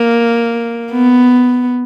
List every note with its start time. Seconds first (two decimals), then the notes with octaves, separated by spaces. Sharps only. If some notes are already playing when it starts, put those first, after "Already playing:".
Already playing: A#3
0.92 B3